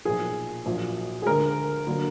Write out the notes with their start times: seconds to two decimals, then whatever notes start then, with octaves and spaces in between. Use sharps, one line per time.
0.05 B1 A#2 F3 G#4
0.66 A#1 A#2 F#3
1.22 G#4
1.26 D2 D3 G#3 A#4
1.87 D3 F#3 A#3